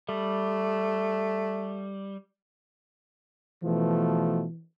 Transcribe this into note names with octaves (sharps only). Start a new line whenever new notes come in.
G3 A3
B2 E3 F3 A3